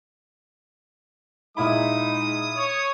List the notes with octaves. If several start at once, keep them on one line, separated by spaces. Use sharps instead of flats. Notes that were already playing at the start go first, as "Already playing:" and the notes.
A#2 G#3 D#4 E4 B5 D#6
C#5